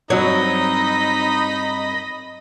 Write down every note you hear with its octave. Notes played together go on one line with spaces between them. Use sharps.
G2 F#3 C4 D#4 C#5 D#5 B5